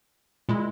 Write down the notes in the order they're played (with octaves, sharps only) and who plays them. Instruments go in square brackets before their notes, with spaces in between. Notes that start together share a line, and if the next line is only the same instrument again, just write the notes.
[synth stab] A#2 G#3 E4